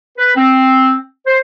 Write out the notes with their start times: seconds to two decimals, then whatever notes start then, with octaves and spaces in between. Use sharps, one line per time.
0.17 B4
0.36 C4
1.27 C5